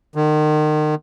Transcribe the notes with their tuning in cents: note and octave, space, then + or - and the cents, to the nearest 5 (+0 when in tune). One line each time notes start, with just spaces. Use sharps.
D#3 -35